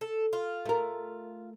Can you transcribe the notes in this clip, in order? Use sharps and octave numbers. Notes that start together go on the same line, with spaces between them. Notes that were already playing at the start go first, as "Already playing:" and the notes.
A4
F4
A3 A#4